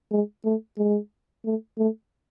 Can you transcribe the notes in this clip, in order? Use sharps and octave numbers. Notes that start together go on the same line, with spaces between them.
G#3
A3
G#3
A3
A3